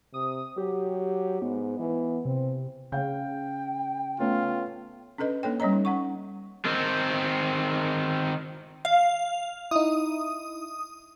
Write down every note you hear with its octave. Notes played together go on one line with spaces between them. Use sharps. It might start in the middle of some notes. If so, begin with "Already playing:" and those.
C3 D#6
F#3 G4
G#2 B3
E3
C3 C4
C#3 F5 G5 G6
A3 B3 C#4 F4
C#4 D4 A4 B4 D#5
A#3 D4 A4 C#5 G5
G3 C#4 C#5 D#5 A#5
D#4
C#4 F#5 C#6
D#3 C4
F5
D#4 E4 D#6